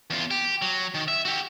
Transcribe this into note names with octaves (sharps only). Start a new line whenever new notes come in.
E2 F4
G4
F#3
D#3
E5
F#4 G4